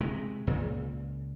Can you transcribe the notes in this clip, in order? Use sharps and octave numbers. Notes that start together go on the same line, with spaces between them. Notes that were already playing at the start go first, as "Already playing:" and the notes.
C3 G#3
C#2 A#2 C#3